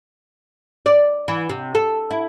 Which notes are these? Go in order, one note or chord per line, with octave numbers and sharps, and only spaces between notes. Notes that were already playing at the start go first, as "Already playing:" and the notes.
D5
E3
C3
A4
E4